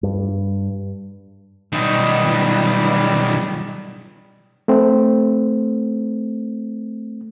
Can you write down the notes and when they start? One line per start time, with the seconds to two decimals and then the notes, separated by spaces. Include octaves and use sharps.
0.03 G2
1.72 B1 D#3 G3
4.68 A3 C4